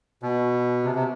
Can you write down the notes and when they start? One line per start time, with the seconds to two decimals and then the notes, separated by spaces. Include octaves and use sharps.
0.23 B2
0.84 C3
0.95 C3